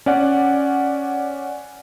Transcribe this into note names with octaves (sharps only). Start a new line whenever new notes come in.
C#4 D5 F#5